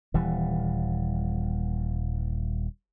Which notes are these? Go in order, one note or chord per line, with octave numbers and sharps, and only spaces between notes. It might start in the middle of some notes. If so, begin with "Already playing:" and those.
D#1 E3 G3